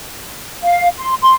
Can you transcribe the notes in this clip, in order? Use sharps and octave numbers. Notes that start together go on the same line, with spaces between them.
F5
C6
C6